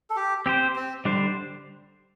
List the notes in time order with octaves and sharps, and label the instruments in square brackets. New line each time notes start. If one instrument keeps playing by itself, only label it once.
[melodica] A4
G4
[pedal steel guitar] C4 G4 C5
[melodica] C4
[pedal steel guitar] D3 G3 D4 C5